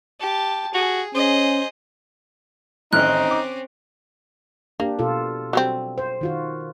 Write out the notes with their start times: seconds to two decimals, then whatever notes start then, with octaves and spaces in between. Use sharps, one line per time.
0.20 G4 A5
0.74 F#4 G#4
1.15 C#4 G#4 C5 D#5
2.93 A1 D#3 C4 C#4 D#4 F6 F#6
3.31 D6
4.80 A#3 D4 G4
4.99 B2 F4 A4
5.53 F#3 G3 C4
5.98 C5
6.21 D#3 F4 F#4